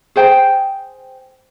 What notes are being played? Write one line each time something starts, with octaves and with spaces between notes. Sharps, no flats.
G#4 C5 G5